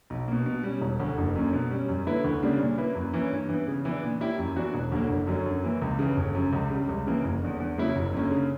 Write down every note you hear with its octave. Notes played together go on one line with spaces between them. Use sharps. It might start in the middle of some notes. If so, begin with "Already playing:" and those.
B1
B2 A#3
B2
G3 C#4
E1
D2 D3
F#1
F#2 D3 A#3 C#4
B2
G3 C#4
F#2
D3 A#3 E4 B4
D2
C#3 G3 A#3 D4
A#2
A#3 E4 B4
F#2
E3 A#3 C#4
G2
E3 B3
C#3
E3 B3 D4
A#2
A#3 E4 G4
F#2
E3 B3 D4 F#4
E1
D2 D3 F#3 A#3
F#1
F#2 D3 F#3 C#4
F#2
E3 A#3
C#2
C#3 E3
G1
F#2 C#3
C#2
C#3 G3
C#2
C#3 E3 A#3
F#1
E2 D3
E2
C#3 F#3 A#3 E4
F#1
F#2 D3 A#3 C#4
C#3